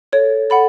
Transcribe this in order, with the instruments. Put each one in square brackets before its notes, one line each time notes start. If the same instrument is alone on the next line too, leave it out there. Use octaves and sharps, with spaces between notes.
[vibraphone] A4 [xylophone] C#5
[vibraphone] A4 [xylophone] F#5 B5